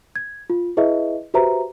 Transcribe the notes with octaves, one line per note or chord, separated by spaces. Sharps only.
G#6
F4
E4 G#4 B4 D#5 E5
F#4 G4 B4 C5 E5 A#5